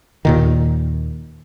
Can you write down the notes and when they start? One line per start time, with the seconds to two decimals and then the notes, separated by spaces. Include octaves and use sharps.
0.25 D#2 A#2 D#3